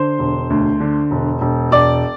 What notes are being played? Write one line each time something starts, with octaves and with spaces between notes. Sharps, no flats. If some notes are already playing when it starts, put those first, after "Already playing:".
Already playing: D3 C5 C6
E1
D2
D3
E1
E1
E1 D5 D6